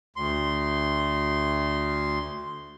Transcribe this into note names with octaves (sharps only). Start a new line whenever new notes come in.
D2 C6